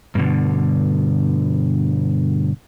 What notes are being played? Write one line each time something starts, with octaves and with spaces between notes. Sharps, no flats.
G2 B2 D3